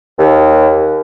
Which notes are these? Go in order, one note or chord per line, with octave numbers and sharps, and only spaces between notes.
D#2